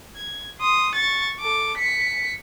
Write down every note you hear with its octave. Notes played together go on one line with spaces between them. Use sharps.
G#6
C6 D#6
C#6 A6
A4 D6
B6 C#7